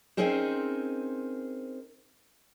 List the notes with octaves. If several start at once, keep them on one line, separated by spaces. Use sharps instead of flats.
C4 C#4 D#4 G#4 A#4 C5